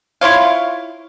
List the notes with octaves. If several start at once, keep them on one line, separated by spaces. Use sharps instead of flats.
E4 F4 C#5 F5